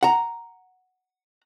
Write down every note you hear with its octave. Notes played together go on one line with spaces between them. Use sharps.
F#5 A#5